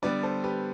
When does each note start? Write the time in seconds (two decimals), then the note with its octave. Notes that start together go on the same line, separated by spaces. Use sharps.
0.02 D3 G3 B3 B4 D5
0.23 A4 C5
0.44 G4 B4